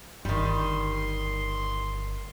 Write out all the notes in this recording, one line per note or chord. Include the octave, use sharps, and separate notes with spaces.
G1 D#3 G3 C6